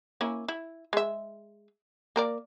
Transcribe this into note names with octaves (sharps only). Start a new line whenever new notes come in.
A#3 C#4 E4
E4
G#3 E5
A#3 A#4 D5